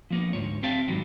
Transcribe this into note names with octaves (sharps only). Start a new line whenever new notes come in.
F3 A#3 B3
D2 G#2 C#5
C4 G4 E5 F5 G5 A5
G#2 D#3 F#3 G3